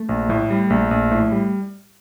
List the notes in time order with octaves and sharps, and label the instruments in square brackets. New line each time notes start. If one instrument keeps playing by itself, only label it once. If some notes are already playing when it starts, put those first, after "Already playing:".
Already playing: [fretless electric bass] A3
[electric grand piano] A#1
[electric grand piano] A2 [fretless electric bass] A3
[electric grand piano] G3
[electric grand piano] A#1 [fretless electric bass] A3
[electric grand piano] A#1
A2
G3